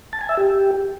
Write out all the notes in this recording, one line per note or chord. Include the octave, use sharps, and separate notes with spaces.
A5
G#5
E5
G4